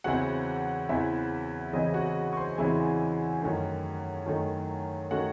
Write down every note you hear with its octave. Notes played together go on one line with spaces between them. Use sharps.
E2 C#3 E3 C4 E4 F#4 F#5
E2 C#3 E3 C4 E4 E5
E2 C#3 E3 C4 E4 D#5
F#4 F#5
C#6
C5 C6
E2 C#3 E3 C4 E4 G#4 G#5
F#2 D#3 A3 C#4
F#2 D#3 A3 C#4
D#3 A3 C#4 F#4 F#5